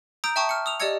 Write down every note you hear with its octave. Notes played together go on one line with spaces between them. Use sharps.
A#5 D#6 E6 G6 D7
E5 G5 A5 C#6 D#6
F6 C#7
D#6 E6 F7
G4 D5 D#5 E6 G#6 C#7